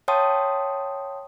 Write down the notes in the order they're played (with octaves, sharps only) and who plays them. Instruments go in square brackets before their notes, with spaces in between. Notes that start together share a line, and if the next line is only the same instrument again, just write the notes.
[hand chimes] C#5 F5 G5 A5 C6 D#6